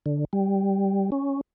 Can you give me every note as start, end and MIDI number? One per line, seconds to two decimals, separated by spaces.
0.06 0.25 50
0.33 1.10 55
1.12 1.41 61